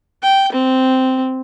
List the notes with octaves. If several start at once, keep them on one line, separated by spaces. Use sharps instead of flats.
G5
C4